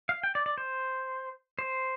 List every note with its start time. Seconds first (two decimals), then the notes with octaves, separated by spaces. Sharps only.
0.09 F5
0.24 G5
0.35 D5
0.46 D5
0.58 C5
1.59 C5